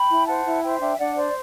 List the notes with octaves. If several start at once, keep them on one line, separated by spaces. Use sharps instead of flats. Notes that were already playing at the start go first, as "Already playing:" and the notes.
Already playing: G5 B5
E4
C5 F#5 A5
E4
C5 E5 G5
D4 E5 G5
D4 D5 F#5
C5 D5